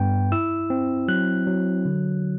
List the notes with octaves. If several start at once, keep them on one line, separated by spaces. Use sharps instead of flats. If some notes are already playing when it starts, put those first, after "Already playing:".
Already playing: G2 B3 G5
E4 E6
C4
F#3 F#6
F#3
D3